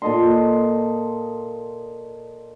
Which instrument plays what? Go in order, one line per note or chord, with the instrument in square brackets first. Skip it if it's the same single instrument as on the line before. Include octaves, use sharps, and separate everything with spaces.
[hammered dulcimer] A#2 A4 D#5 C6